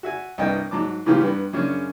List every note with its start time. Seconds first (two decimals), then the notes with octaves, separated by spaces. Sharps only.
0.03 F#4 E5 G#5
0.38 C2 G2 B3 D#5 G5
0.71 G#2 F#3 A5 D6
1.06 A2 C#3 E3 F#3 F4 G4
1.21 G2 B3
1.53 F#2 C#3 C#4 D4